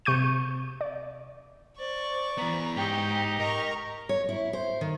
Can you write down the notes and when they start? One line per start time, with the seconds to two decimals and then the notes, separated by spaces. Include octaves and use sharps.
0.05 C3 C#6 G6 D#7
0.81 D5
1.79 C5 D5 C#6
2.38 E3 B3 A#5
2.76 G#2 D#4 G4 G5
3.40 A#4 D#5 A#5 C#6
4.09 C#5
4.29 E4
4.53 C5
4.81 D#3